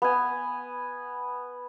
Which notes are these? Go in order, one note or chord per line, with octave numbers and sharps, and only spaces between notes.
B3 G#5